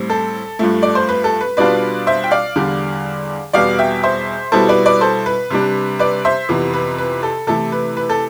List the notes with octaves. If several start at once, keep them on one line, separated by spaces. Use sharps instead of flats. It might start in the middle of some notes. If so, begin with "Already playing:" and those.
Already playing: A2 G3 C4
A4
G2 F3 A3
D5
C5
B4
A4
B4
B2 G3 B3 D4 F4 B4 D5
C5 E5
G5
D5 F5
E2 D3 G3
E2 B2 G3 B3 D5 F5
E5 G5
C5 E5
B2 G3 B3 E4 A4 C5
B4 D5
B4 D5
A4 C5
B4
C3 G3 D4
B4 D5
C5 E5
F2 C3 E3 B3
B4
B4
A4
C3 E3 A3 E4 A4
B4
B4
A4